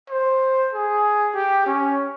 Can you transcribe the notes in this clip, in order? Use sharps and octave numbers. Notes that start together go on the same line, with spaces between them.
C5
G#4
G4
C#4